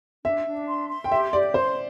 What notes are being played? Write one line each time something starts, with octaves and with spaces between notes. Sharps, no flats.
D4 E5
D4
C6
C6
G5
G4 E5
G4 D5
C5 C6